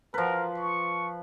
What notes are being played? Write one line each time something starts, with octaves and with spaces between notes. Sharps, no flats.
F3 A#4 B4
C#6